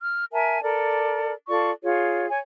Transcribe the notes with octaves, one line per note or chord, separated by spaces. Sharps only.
F6
A#4 E5 G#5 A5
A4 A#4 D5
F4 A4 D5 C#6
F4 G#4 C#5
C#5 G#5